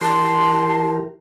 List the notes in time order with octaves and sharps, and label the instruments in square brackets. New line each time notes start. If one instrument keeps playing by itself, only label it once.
[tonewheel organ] E3 G4 A#4 [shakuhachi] A5 [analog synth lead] C6